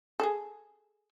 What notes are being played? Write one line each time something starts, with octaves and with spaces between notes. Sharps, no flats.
G#4 A4